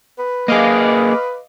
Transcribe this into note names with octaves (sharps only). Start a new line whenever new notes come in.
B4
A#3 G#4 D#5 F5 D6